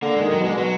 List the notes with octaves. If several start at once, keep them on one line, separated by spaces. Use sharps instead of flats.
D3 A#3
D#3 G#3
F#3
B2
D3 G#3
B2 F#3